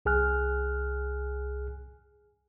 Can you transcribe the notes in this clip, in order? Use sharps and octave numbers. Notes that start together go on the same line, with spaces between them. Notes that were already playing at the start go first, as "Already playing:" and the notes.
C2 G#4 G#5 F6 F#6